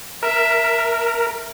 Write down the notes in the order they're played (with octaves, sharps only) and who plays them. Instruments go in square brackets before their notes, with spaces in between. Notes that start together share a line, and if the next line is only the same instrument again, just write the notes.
[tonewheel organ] A#4 [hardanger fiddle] E5